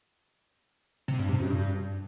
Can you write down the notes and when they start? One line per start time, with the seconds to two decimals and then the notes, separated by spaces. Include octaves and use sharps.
1.08 C3
1.19 G2
1.29 C3
1.40 F#2
1.50 G2